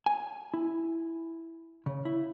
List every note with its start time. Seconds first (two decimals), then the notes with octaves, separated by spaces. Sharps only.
0.06 G#5
0.54 E4
1.86 C#3
2.05 E4